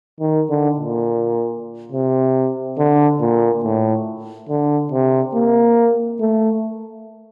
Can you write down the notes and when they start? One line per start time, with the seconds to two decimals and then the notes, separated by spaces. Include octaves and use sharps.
0.20 D#3
0.50 D3
0.78 A#2
1.92 C3
2.78 D3
3.20 A#2
3.64 A2
4.49 D3
4.92 C3
5.34 A#3
6.20 A3